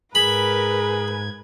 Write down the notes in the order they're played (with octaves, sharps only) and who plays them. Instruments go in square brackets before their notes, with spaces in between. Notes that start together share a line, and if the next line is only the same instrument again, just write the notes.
[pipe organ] G#2 G#6 [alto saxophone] G#4 [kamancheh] A#4 B4 [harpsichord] B5